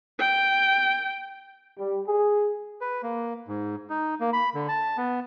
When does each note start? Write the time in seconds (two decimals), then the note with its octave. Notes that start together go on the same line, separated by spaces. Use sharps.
0.19 G5
1.78 G3
2.07 G#4
2.81 B4
3.03 A#3
3.48 G#2
3.90 D#4
4.20 A#3
4.33 B5
4.54 D3
4.68 A5
4.97 B3